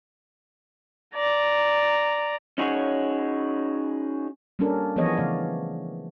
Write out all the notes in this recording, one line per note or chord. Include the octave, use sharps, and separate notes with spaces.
D5 A#5
C#4 D#4 F#4 G#4 C#5
G3 A#3 C#4 D4 A4 A#4
E3 F3 B3 G#4 C#5 D#5
C#3 E3 A3 D5 F5